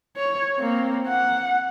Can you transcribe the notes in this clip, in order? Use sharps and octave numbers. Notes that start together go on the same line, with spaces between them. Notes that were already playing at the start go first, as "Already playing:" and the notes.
C#5
A#3 C4
F#5